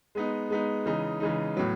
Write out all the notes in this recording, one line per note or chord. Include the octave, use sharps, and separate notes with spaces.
G#3 B3 D#4
G#3 B3 D#4
C#3 E3 G#3 D#4
C#3 E3 G#3 D#4
A2 F#3 B3